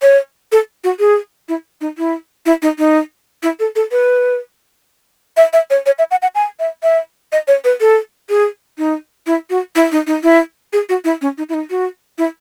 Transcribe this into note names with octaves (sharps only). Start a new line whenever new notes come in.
C#5
A4
F#4
G#4
E4
D#4
E4
E4
D#4
D#4
E4
A4
A4
B4
E5
E5
C#5
C#5
E5
F#5
F#5
G#5
E5
E5
D#5
C#5
B4
A4
G#4
D#4
E4
F#4
E4
D#4
D#4
E4
G#4
F#4
E4
C#4
D#4
E4
D#4
F#4
E4